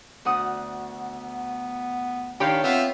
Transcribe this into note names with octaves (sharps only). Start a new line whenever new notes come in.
D2 B3 F#5 D#6
D#3 D4 G4 C#5 F5 B5 G6
B3 C4 F4 E5